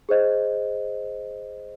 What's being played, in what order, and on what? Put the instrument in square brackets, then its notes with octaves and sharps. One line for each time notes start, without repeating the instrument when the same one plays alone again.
[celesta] G#4 C5 D#5